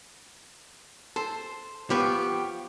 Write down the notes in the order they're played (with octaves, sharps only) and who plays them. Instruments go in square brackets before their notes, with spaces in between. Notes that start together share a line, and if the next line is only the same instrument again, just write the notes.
[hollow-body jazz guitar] A4 [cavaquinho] C5
[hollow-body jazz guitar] F3 B3 [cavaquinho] G4 G5 C#6